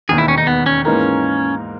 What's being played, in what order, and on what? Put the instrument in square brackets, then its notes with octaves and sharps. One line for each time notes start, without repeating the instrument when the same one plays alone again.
[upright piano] E1 D#2 D#3 [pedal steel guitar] G#4
[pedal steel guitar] E4
C#4
D#4
B3
C#4
[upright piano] G#2 E3 A#3 D#4 A#4 [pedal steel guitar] C#4